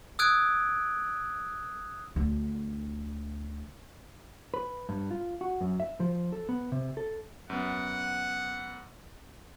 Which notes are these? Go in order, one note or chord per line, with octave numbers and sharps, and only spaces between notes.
D#6 E6 F#6 G#6 D7
D2 D3
B4
G2
F4
F#4
F#2
E5
F3
A4
B3
C3
A4
F#2 B3 F#5